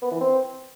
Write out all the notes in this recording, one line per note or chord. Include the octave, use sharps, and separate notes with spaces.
B3
E3
C4